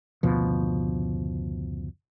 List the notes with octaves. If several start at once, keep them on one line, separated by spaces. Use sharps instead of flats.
F#1 D2 B2 F3